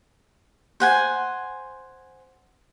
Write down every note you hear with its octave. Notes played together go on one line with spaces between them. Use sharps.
C5 F#5 G#5